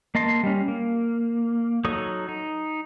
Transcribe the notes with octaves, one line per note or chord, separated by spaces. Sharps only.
A#3 D#5 A5 C6
G3 C#4
A#3
F#3 D#4 A4 C#5 D#6
D#4